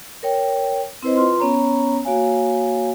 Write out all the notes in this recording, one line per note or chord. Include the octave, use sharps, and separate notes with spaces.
A#4 C#5 G5
C4 E4 B4 C5 D#5
F4 B4 C6
B3 C#4 C#5 A#5
A#3 F#4 C#5 F5 G#5